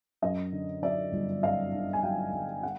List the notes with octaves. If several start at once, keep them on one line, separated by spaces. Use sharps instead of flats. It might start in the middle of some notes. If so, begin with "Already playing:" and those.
F#2 D#5
D3
F#3 D5 E5
G1
F#2 D#5 F5
D3
G#5
F#3 F5 G5
G1
F#5